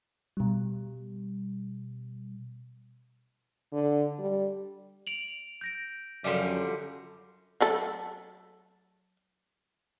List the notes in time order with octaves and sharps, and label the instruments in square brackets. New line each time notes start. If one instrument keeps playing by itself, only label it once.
[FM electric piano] B2 G3
[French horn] D3
G3
[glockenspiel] D7 F7 F#7
G6 A#6 D7
[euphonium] F#2 [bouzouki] D3 F3 G3
[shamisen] F#3 A3 A4